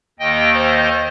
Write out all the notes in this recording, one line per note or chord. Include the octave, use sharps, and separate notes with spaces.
D#2 D#3 D#5 G5
C5 D#5